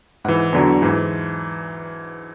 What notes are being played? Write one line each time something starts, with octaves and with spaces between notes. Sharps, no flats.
G#2 E3 F#5
E2 D3 F#3
G#2 E3